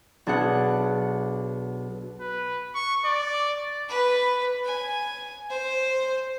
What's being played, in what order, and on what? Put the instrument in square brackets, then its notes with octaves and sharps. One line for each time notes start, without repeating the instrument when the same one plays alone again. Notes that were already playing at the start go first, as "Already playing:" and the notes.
[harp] B1 D4 G#4 F#5
[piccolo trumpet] B4
C#6
D5
[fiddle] B4
G#5
C5